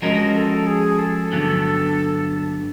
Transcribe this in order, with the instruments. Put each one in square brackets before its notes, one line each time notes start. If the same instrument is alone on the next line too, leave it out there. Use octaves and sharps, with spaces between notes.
[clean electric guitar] F3 G#3 C#4 F#4 A#4 [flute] D#5
[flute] A4
G#4
A4
[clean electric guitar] G2 D3 F#3 B3